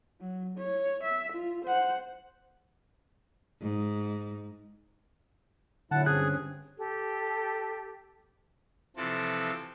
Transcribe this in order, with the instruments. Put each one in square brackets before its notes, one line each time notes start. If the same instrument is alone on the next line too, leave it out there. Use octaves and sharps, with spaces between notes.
[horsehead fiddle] F#3
C#5
E5
F4
C5 F#5
[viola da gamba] G#2
[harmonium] A#2 F#3 E4 [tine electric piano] D3 [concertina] F#5 A5
[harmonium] G2 C4 C#4 [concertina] G#4 G#5 [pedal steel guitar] F#6
[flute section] G4 A4
[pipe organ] C3 E3 F3 C4 A4